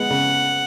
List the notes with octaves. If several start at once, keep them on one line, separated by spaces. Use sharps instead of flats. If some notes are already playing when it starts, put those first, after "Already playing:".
Already playing: G#3 B3 F#5
C#3